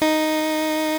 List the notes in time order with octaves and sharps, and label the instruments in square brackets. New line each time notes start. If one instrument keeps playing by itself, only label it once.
[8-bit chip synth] D#4